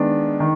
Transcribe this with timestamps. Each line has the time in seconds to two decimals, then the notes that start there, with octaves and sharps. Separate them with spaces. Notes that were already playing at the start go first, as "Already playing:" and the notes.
Already playing: D#3 G#3 B3 D4
0.40 D#3